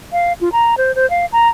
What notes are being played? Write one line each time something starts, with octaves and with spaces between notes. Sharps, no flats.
F5
F4
A#5
C5
C5
F5
A#5